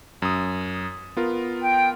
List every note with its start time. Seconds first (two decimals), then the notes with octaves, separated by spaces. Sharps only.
0.22 F#2 D#6
1.17 B3 F4 A#4
1.62 G5